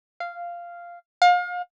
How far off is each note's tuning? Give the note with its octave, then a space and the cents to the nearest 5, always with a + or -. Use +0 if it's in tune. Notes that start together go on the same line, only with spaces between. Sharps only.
F5 -10
F5 +35